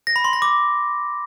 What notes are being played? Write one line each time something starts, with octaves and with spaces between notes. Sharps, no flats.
A#6
B5
C6
A#6
D6